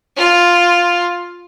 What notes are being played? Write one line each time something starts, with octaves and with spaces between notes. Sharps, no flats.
F4